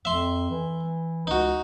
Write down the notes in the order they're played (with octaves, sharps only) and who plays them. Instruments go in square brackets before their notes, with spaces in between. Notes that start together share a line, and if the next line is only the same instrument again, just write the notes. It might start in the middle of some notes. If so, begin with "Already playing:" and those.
[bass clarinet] F2 [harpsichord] E5 C6
[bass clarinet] E3
[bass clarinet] C#2 [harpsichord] D#4 F#4